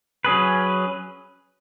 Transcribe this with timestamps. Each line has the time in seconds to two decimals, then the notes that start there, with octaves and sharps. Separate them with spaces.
0.25 F#3 C#4 G#4 B4